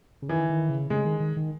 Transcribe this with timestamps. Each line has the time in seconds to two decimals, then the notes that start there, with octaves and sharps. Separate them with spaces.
0.22 C#3
0.29 D#3 E3
0.50 D#3
0.69 C#3
0.90 C#3 G#3
1.05 D#3
1.20 D#3
1.37 D#3